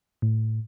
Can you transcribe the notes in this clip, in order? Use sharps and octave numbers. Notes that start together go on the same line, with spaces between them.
A2